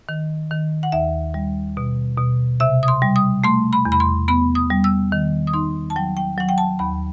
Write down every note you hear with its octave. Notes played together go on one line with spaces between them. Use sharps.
D#3
D#3
F#5
D#2 E5
G3
B2
B2
C3 E5
D#6
C6
G3
D#6
A3 C6
B5
E2
B5
C6
B3 B5
D#6
G3
E6
D#3
D#6
D#4 C6
A5
F#3 G5
G5
F#3 F#5
G5
A5
D#2 B5